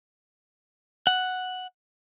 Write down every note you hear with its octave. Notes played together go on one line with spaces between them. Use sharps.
F#5